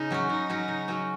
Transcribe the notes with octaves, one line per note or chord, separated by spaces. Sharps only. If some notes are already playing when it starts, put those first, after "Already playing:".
Already playing: C#3 D#4
F#3 C#4 F#4
C#3 D#4
F#3 C#4 F#4
C#3
F#3 C#4 F#4